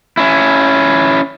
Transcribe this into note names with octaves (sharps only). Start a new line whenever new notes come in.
C#4 E4